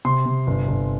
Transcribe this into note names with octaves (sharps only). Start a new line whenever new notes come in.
C3 C6
C3
G1
G1